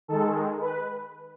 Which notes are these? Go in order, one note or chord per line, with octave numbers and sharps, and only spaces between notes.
D#3 G#3 A4
B4